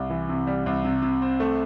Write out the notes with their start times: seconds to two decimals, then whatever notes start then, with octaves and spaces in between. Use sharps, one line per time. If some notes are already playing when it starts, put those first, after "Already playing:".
Already playing: C2 G3
0.10 E3
0.29 C3
0.47 G3
0.66 C2
0.84 C3
1.02 C3
1.22 C4
1.40 A3